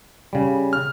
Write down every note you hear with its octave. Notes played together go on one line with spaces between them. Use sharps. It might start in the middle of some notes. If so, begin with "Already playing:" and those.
C#3 G3
F6